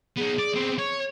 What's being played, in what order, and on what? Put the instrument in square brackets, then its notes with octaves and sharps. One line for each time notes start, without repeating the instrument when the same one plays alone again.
[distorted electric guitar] B3 D#4 [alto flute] G#4
[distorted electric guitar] D5
B3 C4
C#5